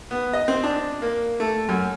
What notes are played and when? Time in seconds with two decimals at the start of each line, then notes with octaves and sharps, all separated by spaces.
0.11 B3
0.33 D#5
0.48 C4
0.64 D4
1.02 A#3
1.40 A3
1.69 F#2